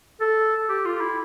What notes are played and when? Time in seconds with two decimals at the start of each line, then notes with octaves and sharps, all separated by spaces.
0.21 A4
0.69 G4
0.85 F4
1.01 E4